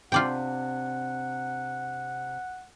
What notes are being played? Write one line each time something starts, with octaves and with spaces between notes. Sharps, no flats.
C3 D4 F4 D5 F#5 G5